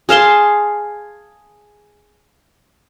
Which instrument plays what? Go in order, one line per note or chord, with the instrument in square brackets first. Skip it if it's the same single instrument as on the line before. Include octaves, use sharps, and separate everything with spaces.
[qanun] G#4 F5 A5 C6